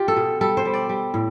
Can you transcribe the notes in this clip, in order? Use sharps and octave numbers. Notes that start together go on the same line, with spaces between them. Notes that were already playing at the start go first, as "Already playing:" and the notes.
Already playing: F4 G4
A4
B2
G3 A4
C5
G3
D5
G3
A2